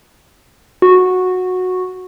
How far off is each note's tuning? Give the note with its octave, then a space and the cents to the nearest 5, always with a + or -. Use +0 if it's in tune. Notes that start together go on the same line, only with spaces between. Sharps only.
F#4 -10